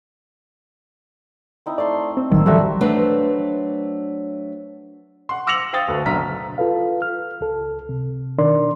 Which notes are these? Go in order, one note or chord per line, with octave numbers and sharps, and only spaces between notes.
C4 D#4 E4
A3 D5 C6
C4
A1 D#3 F#3 G3 A#3 E6
E3 F3 G3 C4 D4 F#4 A4 E5
F#3 A3 C4 D4 B4
F#5 C6
D6 E6 A#6 C#7 F7 F#7
C5 F5 G5 D#6 A6
D2 A4 B4
F#1 B1 D3 A#5 B6
F4 A4 B4 F5
F6
C#2 A4
C3
B2 D#3 D4 A#4 D5 C6